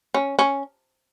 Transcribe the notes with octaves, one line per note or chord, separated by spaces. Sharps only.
C#4
C#4